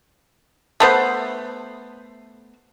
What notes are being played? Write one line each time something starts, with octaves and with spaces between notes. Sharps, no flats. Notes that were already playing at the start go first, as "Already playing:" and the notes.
A3 B3 C5